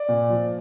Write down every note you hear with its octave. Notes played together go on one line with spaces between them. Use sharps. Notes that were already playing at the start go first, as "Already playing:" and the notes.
Already playing: D5
A#2
F3